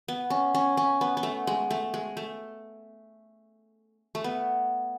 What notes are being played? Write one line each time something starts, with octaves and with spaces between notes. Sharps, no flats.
B3
C#4
C#4
C#4
B3
B3
A3
G#3
A3
G#3
A3
A3
B3